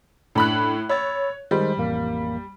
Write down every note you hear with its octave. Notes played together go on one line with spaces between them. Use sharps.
A2 D4 B5 F#6
C#5 B5 E6 A6
D#3 G3 G#3 C5
A1 F2 A#3